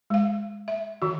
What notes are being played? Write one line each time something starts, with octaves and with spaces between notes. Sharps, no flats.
G#3 F5
E5
D#3 F#4